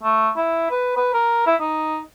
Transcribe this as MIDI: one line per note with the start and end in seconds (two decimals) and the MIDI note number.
0.03 0.30 57
0.37 0.68 64
0.70 0.95 71
0.96 1.09 71
1.14 1.44 70
1.47 1.56 64
1.61 1.99 63